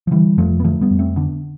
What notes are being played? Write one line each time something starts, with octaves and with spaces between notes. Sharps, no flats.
F3
D3 E3 G3
F2 F3 A3
B3
D3 F3 A3
G3 B3
F2
A3 C4
D3 B3 D4